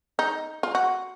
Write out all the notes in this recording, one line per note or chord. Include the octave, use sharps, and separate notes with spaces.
D#4
F4
F#4